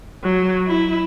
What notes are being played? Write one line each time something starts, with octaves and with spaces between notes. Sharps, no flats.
F#3
E4